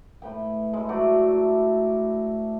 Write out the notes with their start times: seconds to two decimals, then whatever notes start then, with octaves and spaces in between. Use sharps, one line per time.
0.22 A2 B4 G5
0.73 A2 G#3 E4
0.89 F#3 A3 F#4 D5